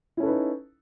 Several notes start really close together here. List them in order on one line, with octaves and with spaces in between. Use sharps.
E4 C#4 A4 B4 D#4